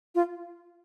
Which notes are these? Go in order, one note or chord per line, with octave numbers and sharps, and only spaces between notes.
F4